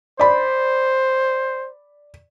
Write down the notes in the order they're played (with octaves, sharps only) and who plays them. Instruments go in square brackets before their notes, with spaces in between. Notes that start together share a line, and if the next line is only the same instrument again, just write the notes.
[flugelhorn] C5 [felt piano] D5 B5